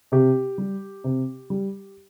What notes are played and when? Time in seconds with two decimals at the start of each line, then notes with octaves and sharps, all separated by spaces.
0.12 C3 G4
0.58 G3
1.04 C3
1.50 G3